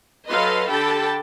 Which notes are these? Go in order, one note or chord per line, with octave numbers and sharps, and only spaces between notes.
F#3 A4 B4 D#5 F5 C6
D3 G4 A4 G5 A5 B5